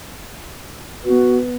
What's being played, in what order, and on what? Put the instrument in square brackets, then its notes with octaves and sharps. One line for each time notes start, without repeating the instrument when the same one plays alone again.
[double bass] B3 [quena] F#4